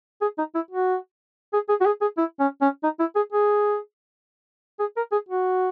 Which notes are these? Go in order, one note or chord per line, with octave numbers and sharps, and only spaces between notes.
G#4
D#4
E4
F#4
G#4
G#4
F#4
G#4
G#4
E4
C#4
C#4
D#4
E4
G#4
G#4
G#4
A#4
G#4
F#4